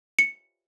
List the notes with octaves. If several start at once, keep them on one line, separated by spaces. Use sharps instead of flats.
C#7